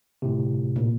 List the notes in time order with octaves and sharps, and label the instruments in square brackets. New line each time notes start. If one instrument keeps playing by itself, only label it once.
[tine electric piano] G1 A2 C3
[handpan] A#2